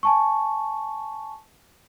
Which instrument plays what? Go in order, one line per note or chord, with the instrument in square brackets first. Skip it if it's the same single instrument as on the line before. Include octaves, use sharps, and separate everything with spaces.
[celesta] G#5 A5 C#6